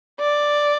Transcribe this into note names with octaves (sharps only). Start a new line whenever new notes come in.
D5